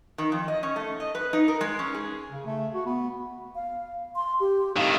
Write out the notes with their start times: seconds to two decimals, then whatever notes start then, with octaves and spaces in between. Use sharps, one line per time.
0.18 D#3
0.32 F2
0.48 D#5
0.63 C#4
0.76 A3
1.00 D#5
1.15 B4
1.33 D#4
1.48 A#4
1.61 G#3
1.79 C#4
1.94 G#4
2.31 C#3
2.46 A3
2.74 F#4
2.86 B3
3.55 F5
4.16 C6
4.40 G4
4.76 A2 D#3 F5